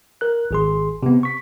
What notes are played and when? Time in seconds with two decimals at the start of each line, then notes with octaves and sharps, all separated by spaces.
0.21 A#4 F#6
0.51 G#1 G#4 C6
1.03 C3 B3
1.23 C#6 B6